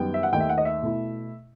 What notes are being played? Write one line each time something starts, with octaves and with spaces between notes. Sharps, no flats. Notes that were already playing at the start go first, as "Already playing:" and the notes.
Already playing: F#2 D#3 G3 B3 G5
E5
F#5
D#2 D#3 A3 D#4 G5
E5
F#5
D#5
E5
B2 A3 E4